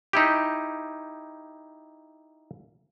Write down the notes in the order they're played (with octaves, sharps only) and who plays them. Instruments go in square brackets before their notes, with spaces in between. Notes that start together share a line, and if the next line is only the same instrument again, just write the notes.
[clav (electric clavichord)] D#4 E4 G4